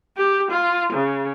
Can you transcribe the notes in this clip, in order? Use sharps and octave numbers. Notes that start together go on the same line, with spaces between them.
G4
F4
C#3